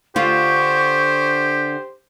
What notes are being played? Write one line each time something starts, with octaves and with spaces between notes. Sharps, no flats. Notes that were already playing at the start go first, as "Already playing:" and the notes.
D3 F4 G4 C5 C#6